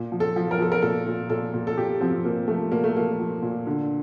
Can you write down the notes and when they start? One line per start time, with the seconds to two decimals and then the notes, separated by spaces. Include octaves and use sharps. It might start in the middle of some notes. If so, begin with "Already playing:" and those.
Already playing: A#2
0.12 F3
0.20 A4
0.36 F3
0.51 A#4
0.59 F3 A4
0.72 A#4
0.82 A#2 A4
1.07 A#2
1.30 A#2 A4
1.54 A#2
1.67 A4
1.77 A#2 G4
2.01 F3 C4
2.25 A#2 A#3
2.48 F3 A3
2.72 A#2 A#3
2.84 A3
2.96 F3 A#3
3.20 F3
3.42 A#2
3.67 D3